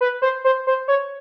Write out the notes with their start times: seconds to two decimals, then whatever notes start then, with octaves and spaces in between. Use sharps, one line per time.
0.01 B4
0.22 C5
0.44 C5
0.67 C5
0.88 C#5